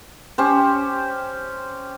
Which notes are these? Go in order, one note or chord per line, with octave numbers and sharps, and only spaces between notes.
C#4 G4 C5